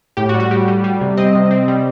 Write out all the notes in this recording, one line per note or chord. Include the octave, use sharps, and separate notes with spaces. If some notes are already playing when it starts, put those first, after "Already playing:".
A2 G4
F#4
G3
F#4
G3 G4
G3
G3
C3
C4 D#5
C3
C4
G3